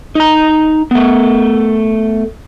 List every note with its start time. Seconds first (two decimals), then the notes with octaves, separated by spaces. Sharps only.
0.15 D#4 A#5
0.91 A3 B3